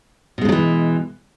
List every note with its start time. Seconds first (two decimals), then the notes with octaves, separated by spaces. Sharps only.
0.38 B2
0.41 G#3
0.45 D3
0.49 F#3
0.52 E3